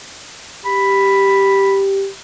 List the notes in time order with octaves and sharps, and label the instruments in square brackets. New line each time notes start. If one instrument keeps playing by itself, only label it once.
[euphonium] G4 [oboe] B5